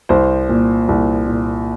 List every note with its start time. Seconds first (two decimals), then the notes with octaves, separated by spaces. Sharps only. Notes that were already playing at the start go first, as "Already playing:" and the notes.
0.09 C2 C5
0.49 A#2
0.88 C2
1.27 A#2